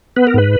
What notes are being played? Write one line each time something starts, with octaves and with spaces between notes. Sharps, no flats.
B3 B4
A#4
G#2 B4